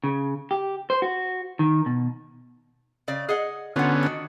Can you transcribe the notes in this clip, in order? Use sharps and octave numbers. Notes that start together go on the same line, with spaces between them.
C#3
G4
C5
F#4
D#3
B2
C#3 D5
G#4 D#5 F#5
D3 B3 C#4 F4 F#5
D#3 D4 F#4